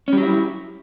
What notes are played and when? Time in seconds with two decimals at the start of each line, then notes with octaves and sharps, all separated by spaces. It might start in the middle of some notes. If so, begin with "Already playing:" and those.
0.08 C#4
0.13 G3
0.18 F#3
0.22 E4